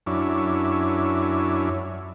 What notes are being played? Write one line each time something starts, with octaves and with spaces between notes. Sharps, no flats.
F#2 C#4 D4 E4